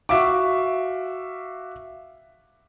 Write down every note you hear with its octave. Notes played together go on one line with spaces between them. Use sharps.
F#4 E5 F5 D6